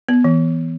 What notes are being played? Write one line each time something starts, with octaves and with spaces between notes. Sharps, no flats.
B3
E3